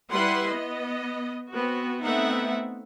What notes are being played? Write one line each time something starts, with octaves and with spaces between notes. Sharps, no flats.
G3 E4 B4 F#5 C6
B3 D#5
B3 C4 F#4
A3 B3 C4 D#4 E5 F#5